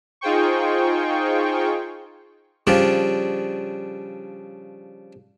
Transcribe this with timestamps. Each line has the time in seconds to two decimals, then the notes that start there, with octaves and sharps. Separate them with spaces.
0.21 D#4 F4 G#4 C5 G5 C#6
2.67 C#3 F3 G3 D4 F4